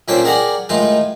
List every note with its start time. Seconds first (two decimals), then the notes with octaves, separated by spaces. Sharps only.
0.08 A#2 C#4 D4 A4 C5 G5
0.24 G4 G#4 A#4 D5 F#5 G#5
0.69 A2 D#3 G#3 D#4 F4